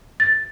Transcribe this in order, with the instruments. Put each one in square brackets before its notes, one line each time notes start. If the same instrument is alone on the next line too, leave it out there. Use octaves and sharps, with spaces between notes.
[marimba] A6